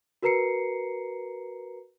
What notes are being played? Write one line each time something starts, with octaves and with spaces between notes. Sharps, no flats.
F#4 A#4 B4 A#5 C7 C#7